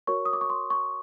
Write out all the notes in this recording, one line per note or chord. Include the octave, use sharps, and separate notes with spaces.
F#4 A#4 C#5 C#6
D#6
D6
C#6
C6
C#6